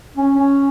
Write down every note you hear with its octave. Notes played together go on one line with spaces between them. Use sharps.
C#4
C#4